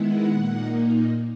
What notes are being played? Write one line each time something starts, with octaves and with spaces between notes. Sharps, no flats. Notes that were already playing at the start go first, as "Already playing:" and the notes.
Already playing: D#3 G#3 B3 E4 F#5
A#2 A#3 D#4